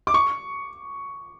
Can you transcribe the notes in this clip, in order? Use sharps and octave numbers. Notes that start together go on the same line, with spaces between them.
D6
C#6